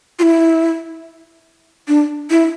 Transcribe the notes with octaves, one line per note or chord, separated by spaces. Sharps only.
F4
E4
D4
E4